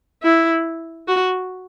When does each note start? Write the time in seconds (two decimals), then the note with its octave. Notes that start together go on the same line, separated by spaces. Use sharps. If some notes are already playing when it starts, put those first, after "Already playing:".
0.22 E4
1.08 F#4